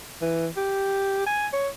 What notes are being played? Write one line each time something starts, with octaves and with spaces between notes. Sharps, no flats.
E3
G4
G#5
C#5